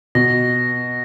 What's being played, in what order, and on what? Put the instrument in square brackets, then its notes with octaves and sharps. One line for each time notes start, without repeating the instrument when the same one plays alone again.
[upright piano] B2 [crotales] A#6